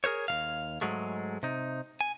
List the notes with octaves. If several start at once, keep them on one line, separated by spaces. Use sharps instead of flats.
G#4 A#4 C5 C#5
D#2 D#3 F5
G#2 F#3 G#3 A3
C3 D#4
G#5